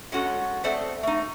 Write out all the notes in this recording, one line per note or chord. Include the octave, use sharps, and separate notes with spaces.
G#3 C#4 F#4 A4
A3 B3 C4 A4 C5 D5
A3 D#4